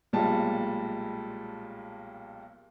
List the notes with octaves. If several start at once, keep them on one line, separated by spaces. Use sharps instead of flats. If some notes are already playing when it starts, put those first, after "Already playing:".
B1 A#2 G3 G#3 A5